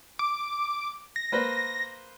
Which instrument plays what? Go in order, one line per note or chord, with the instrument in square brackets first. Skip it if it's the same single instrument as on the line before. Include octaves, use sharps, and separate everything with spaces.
[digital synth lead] D6
A#6
[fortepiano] A#3 B4 C5